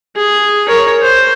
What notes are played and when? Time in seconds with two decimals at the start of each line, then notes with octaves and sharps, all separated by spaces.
0.16 G#4
0.68 A#4 C#5
1.01 C5